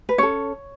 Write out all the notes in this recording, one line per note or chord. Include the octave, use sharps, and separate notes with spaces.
B4
C#4 A4 C#5